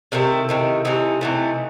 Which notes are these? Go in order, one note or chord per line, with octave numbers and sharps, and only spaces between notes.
C3 D#3 A3 E4
C3 D#3 A3
C3 E3 A3 D#4
C3 E3 A3